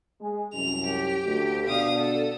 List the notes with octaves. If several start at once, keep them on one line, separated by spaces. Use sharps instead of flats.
G#3 G#5
C2 F#2 F7
G4
D2
B2 D3 D4 F5 D#6
A4